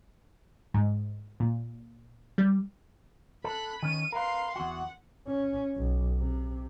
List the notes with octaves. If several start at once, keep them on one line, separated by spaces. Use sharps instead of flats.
G#2
A#2
G3
A4 B5 F#6
D#3 C#4 D#7
A#4 B4 F5 C6
E2 F#4 F#5
C#4
B1
C3